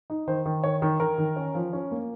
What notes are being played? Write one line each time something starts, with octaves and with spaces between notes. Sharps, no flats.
D#4
D#3 C5
D#3
D#3 C#5
D#3
D#3 A#4
D#3
C#4
F3
C#4
A#3